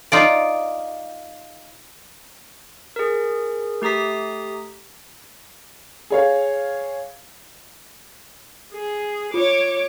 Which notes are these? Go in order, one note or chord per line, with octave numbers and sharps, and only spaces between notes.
D#4 F4 D5
G#4 A#4
A3 G4 A#5 D#6 B6
G#4 C#5 F5
G#4
F4 C#5 D6